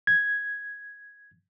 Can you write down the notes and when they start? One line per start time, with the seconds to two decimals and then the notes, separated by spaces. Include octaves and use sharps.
0.07 G#6